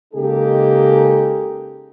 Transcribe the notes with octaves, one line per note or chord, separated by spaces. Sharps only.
C#3 G#3 A#3 D#4 G4 A4